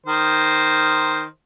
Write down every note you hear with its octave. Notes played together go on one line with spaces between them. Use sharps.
D#3 C5